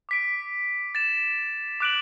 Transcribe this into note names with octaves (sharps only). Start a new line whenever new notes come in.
D6 B6 D7
A6 E7
D6 F#6 D7 F#7